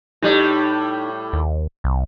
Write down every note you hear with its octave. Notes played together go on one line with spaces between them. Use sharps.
A2 G3 D#4
D#2
C2